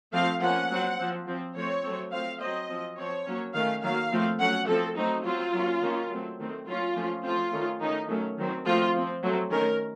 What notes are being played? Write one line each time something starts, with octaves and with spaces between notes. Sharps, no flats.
F3 A3 C4 F5
F3 A#3 C#4 F#5
F#3 C4
F3 C4
F3 C4
F3 A3 C4 C#5
F#3 A3 C4
F3 A3 C4 F5
F#3 C4 D#5
F3 C4
F3 C4 C#5
F#3 A#3 C#4
D#3 A3 C#4 F5
D#3 F#3 A#3 F5
F3 A3 C4
F#3 A3 C#4 F#5
F3 A3 C4 A4
F#3 A3 C4 D#4
F#3 C4 F4
F#3 A#3 C#4
D#3 A#3 C#4
F#3 A3 C4
D#3 A3 C4
F#3 A#3 C#4 F4
F3 A3 C#4
F3 A3 C4 F4
D#3 A3 C#4
D#3 A3 C#4 D#4
D#3 F#3 A3 C#4
D#3 F#3 C4
F3 A3 C4 F4
F3 C4
F#3 A3 C4
D#3 A3 C#4 A#4